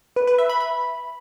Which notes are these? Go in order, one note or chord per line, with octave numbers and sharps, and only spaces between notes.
B4
B4
E5
B5
B5